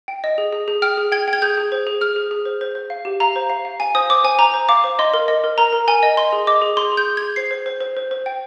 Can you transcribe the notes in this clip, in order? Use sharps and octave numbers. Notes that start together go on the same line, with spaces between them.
G5
D#5
G#4
G#4
G#4
G5 F6
G#4
G5 G#6
G5
G#6
G#4 G6
G#4
C5
G#4
G#4 F6
G#4
G#4
C5
C5
C5
F5
G4
F5 A#5
C5
F5
F5
F5 G#5
C5 D#6
C5 D6
C5 G#5
C5 A#5
C5
F5 D6
C5
D#5 C6
A#4
D#5
A#4
A#4 A#5
A#4
A#4 G#5
D#5
D#5 C6
G#4
D#5 D6
G#4
G#4 C6
G#4
G6
G#4
G#6
G#4
C5 C7
C5
C5
C5
C5
C5
G5